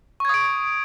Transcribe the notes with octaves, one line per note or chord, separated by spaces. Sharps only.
C#6 D#6 G#6 D7